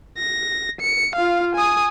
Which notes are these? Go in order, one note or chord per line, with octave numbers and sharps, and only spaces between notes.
A#6
C#7
F4 F5
G#5 D#6